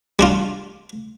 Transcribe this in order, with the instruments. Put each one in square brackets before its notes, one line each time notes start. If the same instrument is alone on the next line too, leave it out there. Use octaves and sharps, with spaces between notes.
[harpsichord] G3 D4 F4